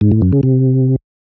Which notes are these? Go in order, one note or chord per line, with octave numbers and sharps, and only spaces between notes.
G#2
A2
F#2
C#3
C3